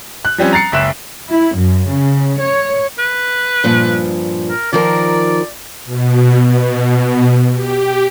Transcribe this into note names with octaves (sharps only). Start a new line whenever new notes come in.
F#6
F3 G3 C4 C#4
A#5 A6 C7 C#7
F#1 C#2 E5 F#6 E7
E4
F#2
C#3
C#5
B4
G2 A#2 F3
A#4
D#3 F3 A#4 D5
B2
B2
G4